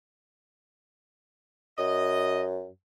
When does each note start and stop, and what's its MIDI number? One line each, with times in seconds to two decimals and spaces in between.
1.78 2.68 42
1.78 2.43 75